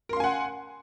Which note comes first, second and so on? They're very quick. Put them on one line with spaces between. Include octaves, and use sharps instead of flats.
A#4 C6 F5 G#5 F#5